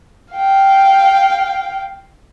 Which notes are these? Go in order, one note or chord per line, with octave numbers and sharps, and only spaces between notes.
F5 G5